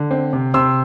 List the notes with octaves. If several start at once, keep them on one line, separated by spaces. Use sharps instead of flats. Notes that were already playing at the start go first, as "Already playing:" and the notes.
Already playing: D3
C4
C3
C3 C6 E6